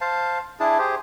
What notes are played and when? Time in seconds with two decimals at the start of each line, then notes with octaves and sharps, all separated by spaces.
0.01 C5 F5 A5
0.60 D4 E4 G#4 A5
0.79 G4 G#4 C5